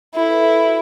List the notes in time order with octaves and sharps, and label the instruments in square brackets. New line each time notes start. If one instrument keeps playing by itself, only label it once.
[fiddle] E4 [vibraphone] A4
[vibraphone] B4
A4
F#4